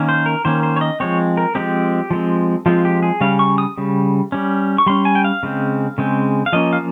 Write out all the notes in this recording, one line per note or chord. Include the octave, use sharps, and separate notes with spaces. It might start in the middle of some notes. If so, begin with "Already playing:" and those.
Already playing: D#3 A#3 C#4
C5
A#4
D#3 A#3 C#4 C5
C5
C#5
D#5
F3 G#3 C4 C#5
A#4
F3 G#3 C4 G4
F3 G#3 C4
F3 G#3 C4 F4
G4
G#4
C#3 G3 C#4 F5
C#6
D#6
C#3 G3
G3 C#4
C#6
G3 C#4 C6
G#5
G5
F5
C#3 G#3 C4
C#3 G#3 C4
F5
F3 A#3 C#4 D#5
F5